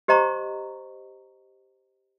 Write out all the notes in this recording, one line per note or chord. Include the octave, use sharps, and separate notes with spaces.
G4 C5 D#5 A#5 C#6